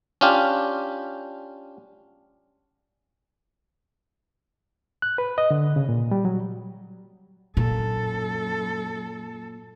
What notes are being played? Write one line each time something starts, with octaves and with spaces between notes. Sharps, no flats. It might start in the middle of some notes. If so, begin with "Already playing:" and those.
C#4 D4 F4 G4
F#6
B4
D#5
D3
C#3
A#2
G3
F#3
F#2 A#2 A4